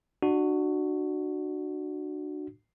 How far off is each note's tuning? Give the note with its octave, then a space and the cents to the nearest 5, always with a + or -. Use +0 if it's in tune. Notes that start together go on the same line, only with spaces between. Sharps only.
D4 +30 F#4 +0